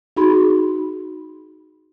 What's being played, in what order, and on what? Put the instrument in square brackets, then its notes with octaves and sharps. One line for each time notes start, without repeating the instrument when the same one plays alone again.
[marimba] D#4 F#4 G#4 B5 C6